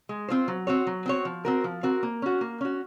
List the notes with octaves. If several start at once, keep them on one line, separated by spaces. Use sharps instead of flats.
G#3
C4 F4 C5
F#3
C4 F#4 C#5
F#3
C4 F#4 C#5
F3
C4 F#4 A#4
F3
C4 F#4 A#4
A#3
C#4 F#4
A#3
C#4 F#4